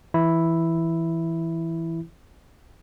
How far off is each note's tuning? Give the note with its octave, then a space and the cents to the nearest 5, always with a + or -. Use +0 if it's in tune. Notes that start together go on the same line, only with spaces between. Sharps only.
E3 +0 E4 +0